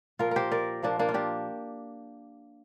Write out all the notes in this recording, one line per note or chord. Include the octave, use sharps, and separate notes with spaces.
A#2 F3 F4 A#4
G4 A#4 C5
A#4 D5
A#2 F3 A#3 D4
A#3 D4
F4
D4 G4